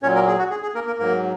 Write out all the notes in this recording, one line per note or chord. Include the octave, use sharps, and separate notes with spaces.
A#2 F#3 C#4 C#5
A#3 A#4
G#4
F#4
G#4
G#4
A#3 A#4
A#3 A#4
G#2 F#3 A#3 A#4